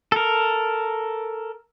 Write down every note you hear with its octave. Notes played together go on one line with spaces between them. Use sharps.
A4 A#4